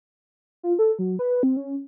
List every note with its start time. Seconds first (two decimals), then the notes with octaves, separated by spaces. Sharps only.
0.63 F4
0.79 A4
0.99 F#3
1.19 B4
1.43 C4
1.57 C#4